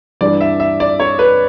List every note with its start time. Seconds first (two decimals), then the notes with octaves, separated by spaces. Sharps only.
0.21 G2 E3 G3 D5
0.41 E5
0.60 E5
0.80 D5
1.00 C#5
1.19 B4